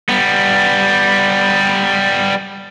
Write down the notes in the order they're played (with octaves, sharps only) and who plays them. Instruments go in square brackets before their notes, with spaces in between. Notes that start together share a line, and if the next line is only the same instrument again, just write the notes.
[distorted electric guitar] G3 B3